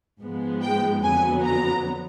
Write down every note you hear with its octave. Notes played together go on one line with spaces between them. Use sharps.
G#2 F3 G#3 B3
G5
F2 D3 F#3 B3 G#5
A#5